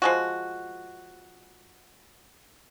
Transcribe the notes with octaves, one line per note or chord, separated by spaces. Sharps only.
F3 G#3 F#4